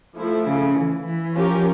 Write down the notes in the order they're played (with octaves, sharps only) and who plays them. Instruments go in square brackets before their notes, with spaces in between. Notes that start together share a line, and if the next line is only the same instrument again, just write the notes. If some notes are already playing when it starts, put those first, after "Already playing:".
[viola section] F3 A3 E4 A4
[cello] C#3
E3
E3
[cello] F3 [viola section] C#4 G4 A#4